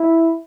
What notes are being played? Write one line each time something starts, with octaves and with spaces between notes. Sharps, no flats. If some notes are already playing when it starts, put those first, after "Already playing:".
Already playing: E4